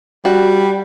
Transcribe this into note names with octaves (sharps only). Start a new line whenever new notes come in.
G3 F#4